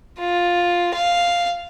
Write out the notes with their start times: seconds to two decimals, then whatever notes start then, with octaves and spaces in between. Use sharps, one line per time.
0.19 F4
0.94 F5